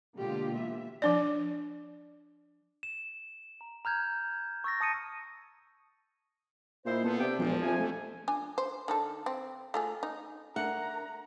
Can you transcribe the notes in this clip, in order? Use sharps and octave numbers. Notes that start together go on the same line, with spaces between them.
B2 D3 G#3 A#3 F4 G4
E3 E5
F3 D4 D5
E7
A#5
A#5 F6 G6 G#6
C#6 E6 A6 A#6
A5 D#6 C#7 D#7
A#2 D#4 E4 C5
B3 A4 C5
C3 D4 E5 G5
E1 E2 G2 A#2 F3
F2 C3 G#5
A3
D4 G#5
C5
D#3 D4 A4
C4
A3 F4 G#4
D#4
A3 D4 A#4 E5 F#5 A#5